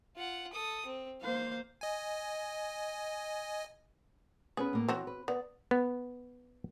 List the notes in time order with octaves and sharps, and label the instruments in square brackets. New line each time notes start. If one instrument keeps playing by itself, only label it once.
[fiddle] F4 F#5
A4 D#6
C4
[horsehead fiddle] A#3 C5 [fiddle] F5
[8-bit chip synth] D#5 G#5
[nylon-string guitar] B3 C#4 B4 [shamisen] G#4
[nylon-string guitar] A2 A#3
[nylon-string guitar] E3 [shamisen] C4 F#4 C#5
[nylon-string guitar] B4
[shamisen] B3 [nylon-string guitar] D5
[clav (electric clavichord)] B3